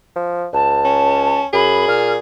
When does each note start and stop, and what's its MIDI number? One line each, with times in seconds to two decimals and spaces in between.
0.16 0.47 53
0.53 1.41 37
0.53 1.44 81
0.85 1.47 61
1.53 1.83 42
1.53 2.17 68
1.53 1.85 83
1.88 2.18 46
1.88 2.08 89